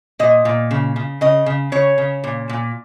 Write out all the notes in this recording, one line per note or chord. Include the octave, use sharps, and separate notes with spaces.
A#2 D#5
A#2
C#3
C#3
C#3 D#5
C#3
C#3 C#5
C#3
A#2
A#2